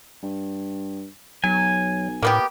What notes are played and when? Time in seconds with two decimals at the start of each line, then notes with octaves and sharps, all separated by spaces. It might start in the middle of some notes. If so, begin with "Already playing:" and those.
0.23 G2
1.44 B1 F#3 G#5
2.22 A2 A#3 B3 G4